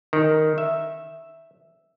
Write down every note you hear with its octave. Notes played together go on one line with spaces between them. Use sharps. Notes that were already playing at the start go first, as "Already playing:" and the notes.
D#3
E5